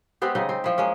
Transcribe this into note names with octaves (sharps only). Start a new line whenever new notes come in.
G#3 B3 C4 G4
C#3 C4 D#4 D#5
C4
F3 E4
G#3 A#3 C#4